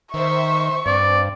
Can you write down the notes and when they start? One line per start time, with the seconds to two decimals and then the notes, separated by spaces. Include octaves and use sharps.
0.14 D#3 C5 E5 C#6
0.86 G2 C4 D5